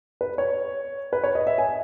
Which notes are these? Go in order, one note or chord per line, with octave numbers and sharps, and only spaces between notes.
B4
C#5
B4
C#5
D#5
E5
G#5